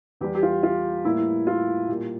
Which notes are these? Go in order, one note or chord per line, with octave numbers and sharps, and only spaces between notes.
E2 E3 G3 G4
G4
F4
F4
A2 G3 A#3 E4
F4
A#2 G3 A#3 G4